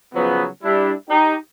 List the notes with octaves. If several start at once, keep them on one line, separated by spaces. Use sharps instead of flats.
C#3 F3 F#3 B3
G3 D4 E4
D#4 G4